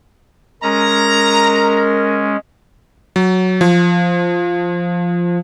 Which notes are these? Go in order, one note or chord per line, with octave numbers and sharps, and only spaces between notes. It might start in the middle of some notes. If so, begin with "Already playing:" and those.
G#3 C#4 A#4 A#5
F#3
F3